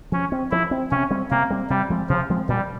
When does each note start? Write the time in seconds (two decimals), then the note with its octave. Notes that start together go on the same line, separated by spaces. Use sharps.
0.12 F3 C#4
0.32 C4
0.51 F3 E4
0.71 C4
0.91 C3 C#4
1.11 G3 C4
1.31 C3 A#3
1.50 G3 C4
1.70 C3 G3
1.90 F3 G#3 C4
2.09 C3 F3
2.30 F3 G#3 C4
2.48 A#2 G3